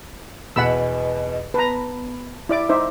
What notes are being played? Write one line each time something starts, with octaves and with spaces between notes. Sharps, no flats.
E2 B2 B4 D#5 F#5 B5 E6
B3 B4 A5 A#5
E4 D5 D6
D#4 C5 E5 D6